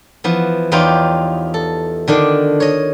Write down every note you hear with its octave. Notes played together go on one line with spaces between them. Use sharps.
E3 F3 B3
E2 D#4 F4 G4 C#5 G5
A4
D3 D#3 D4
C#5 D#5